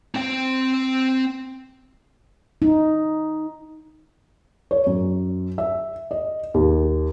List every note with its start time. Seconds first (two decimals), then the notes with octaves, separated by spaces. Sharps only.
0.15 C4 G5
2.62 D#4
4.71 C#5
4.87 F#2
5.58 E5
6.11 D#5
6.54 D#2